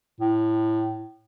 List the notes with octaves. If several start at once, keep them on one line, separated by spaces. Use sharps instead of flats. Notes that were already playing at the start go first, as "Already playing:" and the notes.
A2